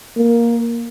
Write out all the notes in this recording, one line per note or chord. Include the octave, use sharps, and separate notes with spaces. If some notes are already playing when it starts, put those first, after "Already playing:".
A#3